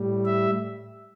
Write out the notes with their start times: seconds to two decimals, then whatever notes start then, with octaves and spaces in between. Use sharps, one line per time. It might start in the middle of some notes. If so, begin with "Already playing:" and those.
Already playing: A2 G3
0.25 E5